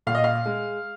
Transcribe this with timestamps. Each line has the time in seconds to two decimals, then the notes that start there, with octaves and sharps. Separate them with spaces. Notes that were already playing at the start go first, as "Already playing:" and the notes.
0.07 A#2 F5
0.15 D#5
0.24 F5
0.46 G#3